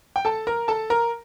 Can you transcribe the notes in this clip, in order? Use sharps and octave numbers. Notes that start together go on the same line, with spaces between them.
G5
A4 A5
A#4 A#5
A4 A5
A#4 A#5